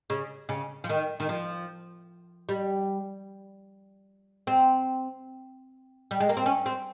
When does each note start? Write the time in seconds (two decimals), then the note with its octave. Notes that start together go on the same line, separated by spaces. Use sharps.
0.10 C#3
0.49 C#3
0.84 F3
0.89 D#3
1.20 D#3
1.29 F3
2.49 G3
4.47 C4
6.11 G3
6.20 G#3
6.29 A#3
6.37 C4
6.46 C#4
6.66 C4